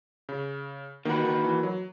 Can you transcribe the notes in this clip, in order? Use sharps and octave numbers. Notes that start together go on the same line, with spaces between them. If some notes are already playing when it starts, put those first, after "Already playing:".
C#3
D#3 A#3 D#4 F#4 B4
D#3
E3
F#3